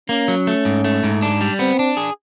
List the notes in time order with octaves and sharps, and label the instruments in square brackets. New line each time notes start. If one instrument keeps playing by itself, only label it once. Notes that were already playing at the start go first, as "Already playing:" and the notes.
[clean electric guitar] A#3 [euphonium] C#4
[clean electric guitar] F#3
A3
G#2
A3
G#2
D4
G3
[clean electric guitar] B3 [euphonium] C4
[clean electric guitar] D4
G#4